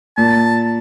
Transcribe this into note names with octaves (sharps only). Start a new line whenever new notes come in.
A#2 A5